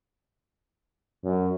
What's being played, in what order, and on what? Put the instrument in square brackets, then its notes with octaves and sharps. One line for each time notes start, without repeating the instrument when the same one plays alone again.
[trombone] F#2